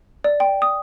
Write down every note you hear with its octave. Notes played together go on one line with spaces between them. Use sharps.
D5
G5
D#6